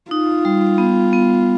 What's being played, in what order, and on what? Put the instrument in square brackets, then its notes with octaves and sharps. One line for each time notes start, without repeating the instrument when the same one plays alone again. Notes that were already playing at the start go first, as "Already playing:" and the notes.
[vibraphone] D#4 [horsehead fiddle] F4
[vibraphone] G3
B3
B3